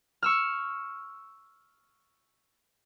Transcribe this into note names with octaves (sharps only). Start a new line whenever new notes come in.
C#6 E6 F6